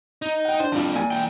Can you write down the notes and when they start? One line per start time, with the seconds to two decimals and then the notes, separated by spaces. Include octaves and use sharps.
0.22 D#4
0.45 F#5 G5
0.60 D4 C5
0.72 F2 G3 D4 F4
0.95 A#2 G#5
1.11 E3 G5